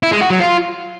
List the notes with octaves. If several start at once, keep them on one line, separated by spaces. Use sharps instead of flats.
E4
G#3
F#4
F#3
F4